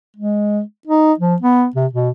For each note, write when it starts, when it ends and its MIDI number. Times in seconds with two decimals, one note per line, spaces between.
0.17 0.61 56
0.87 1.13 63
1.19 1.36 53
1.42 1.67 59
1.76 1.87 48
1.93 2.10 47